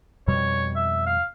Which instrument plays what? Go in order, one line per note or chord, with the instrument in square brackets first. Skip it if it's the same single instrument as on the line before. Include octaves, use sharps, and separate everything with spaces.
[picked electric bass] F2 B2 G3 [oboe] C#5
[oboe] E5
F5